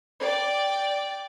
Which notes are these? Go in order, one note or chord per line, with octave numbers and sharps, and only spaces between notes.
D5 G5